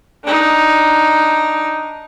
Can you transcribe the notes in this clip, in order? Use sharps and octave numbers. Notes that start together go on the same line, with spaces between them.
D4 D#4